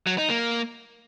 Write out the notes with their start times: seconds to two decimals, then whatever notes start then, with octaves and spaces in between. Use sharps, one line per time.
0.07 F#3
0.18 D#4
0.30 A#3